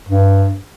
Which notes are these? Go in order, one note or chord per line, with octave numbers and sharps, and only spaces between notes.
G2